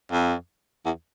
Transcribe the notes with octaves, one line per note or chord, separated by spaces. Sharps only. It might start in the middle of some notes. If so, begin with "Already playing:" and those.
F2
E2